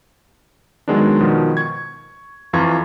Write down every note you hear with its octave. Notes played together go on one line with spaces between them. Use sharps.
D#3 F#3 G#3 B3 D4
B2 D#3 F3
C#6 G#6
F2 E3 F4 A#5 C#6 G#6